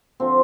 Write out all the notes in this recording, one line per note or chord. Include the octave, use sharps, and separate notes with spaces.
D3 F3 C4